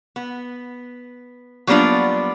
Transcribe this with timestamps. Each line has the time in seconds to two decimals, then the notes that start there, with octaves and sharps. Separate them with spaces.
0.16 B3
1.67 F#3 G3 A#3 B3 D4 F4